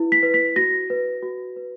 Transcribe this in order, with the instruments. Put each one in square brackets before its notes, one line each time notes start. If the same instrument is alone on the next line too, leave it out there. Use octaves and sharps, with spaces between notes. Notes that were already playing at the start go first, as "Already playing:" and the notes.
Already playing: [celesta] E4 B4
B6
B4
B6
F#4 A#6
B4
F#4
B4